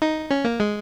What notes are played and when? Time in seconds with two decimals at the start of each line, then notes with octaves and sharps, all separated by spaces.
0.02 D#4
0.31 C#4
0.45 A#3
0.60 G#3